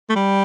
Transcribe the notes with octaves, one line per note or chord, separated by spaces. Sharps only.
A3
G3